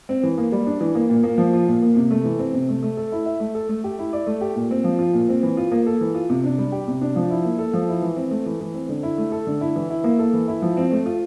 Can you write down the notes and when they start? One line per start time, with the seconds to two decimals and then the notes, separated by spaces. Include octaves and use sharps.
0.09 C4
0.23 E3
0.38 A#3
0.52 G3
0.67 D4
0.81 E3
0.95 A#3
1.10 A#2
1.23 A#3
1.38 F3
1.53 F4
1.68 A#2
1.82 A#3
1.96 C3
2.11 A3
2.25 E3
2.39 C4
2.54 C3
2.69 A3
2.83 A3
2.97 A4
3.12 E4
3.26 E5
3.40 A3
3.55 A4
3.69 A3
3.84 G4
3.99 E4
4.13 D5
4.27 A3
4.41 G4
4.56 A#2
4.71 C4
4.84 F3
4.99 F4
5.14 A#2
5.29 C4
5.43 E3
5.57 F4
5.71 A#3
5.86 A4
6.01 E3
6.15 F4
6.30 C3
6.44 D4
6.58 G3
6.72 G4
6.88 C3
7.01 D4
7.16 F3
7.30 E4
7.45 A#3
7.59 A4
7.73 F3
7.88 E4
8.02 E3
8.16 C4
8.31 A3
8.46 E3
8.61 E3
8.74 C4
8.89 D3
9.03 E4
9.18 A3
9.32 A4
9.47 D3
9.61 E4
9.76 E3
9.90 E4
10.04 A#3
10.19 A4
10.33 E3
10.48 E4
10.62 F3
10.77 C4
10.92 A3
11.06 F4